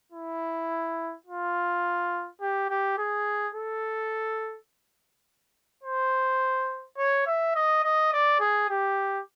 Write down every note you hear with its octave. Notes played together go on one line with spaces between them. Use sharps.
E4
F4
G4
G4
G#4
A4
C5
C#5
E5
D#5
D#5
D5
G#4
G4